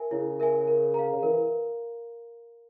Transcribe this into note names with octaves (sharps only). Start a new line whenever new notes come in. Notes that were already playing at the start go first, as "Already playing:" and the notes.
Already playing: A#4 E5 G#5
C#3 E4
A#4 E5 G#5
A#4
F5 A#5
C#3
E3 A#4